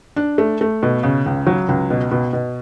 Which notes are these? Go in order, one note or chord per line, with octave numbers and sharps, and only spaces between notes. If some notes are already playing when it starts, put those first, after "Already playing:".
D4
A3
A3
B2
C#3
C#2
F#3
C#2
B2
B2
B2